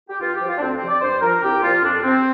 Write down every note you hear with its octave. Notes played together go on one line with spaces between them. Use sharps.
G4
G2 F4
G4
F3
F4
D4
D2 C4
C4
C3 F3
D5
G2 C5
F3 A#4
C2 G4
A#2 F3 F4
F2 D4
C3 F3 C4